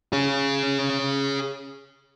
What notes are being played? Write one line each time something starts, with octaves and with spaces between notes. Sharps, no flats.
G#4 C#5